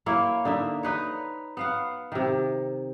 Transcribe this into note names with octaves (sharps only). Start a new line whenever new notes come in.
A#3 E4 C#5
D3 D#4 E5
D#4 B4 C#5
B3 F5 F#5
C3 D#3